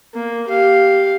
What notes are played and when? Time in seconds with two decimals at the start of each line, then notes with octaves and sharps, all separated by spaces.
0.14 A#3
0.48 G4 F5